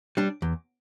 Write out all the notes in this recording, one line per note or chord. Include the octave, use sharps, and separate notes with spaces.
G3 D4
E2